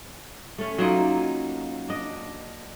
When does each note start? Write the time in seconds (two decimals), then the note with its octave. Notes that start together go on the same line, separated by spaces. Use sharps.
0.58 A3 C#4
0.78 F#3 A#3 D#4 F4
1.89 D4 D#5